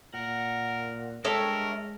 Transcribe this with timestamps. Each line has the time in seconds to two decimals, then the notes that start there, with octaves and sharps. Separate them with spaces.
0.14 A#2 A#4 F#5
1.25 G#3 D4 A4 A#4 C#5 E5 G5